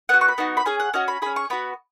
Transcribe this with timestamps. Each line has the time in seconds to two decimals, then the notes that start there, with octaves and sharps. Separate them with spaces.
0.09 B3 F#4 F#5
0.21 C#6
0.28 B5
0.38 B3 D#4 F#4
0.57 B5
0.65 C#4 G#4 G#5
0.80 F#5
0.94 C#4 F#4 D#5
1.08 B5
1.22 C#4 G#4 B5
1.36 C#6
1.50 B3 F#4 B5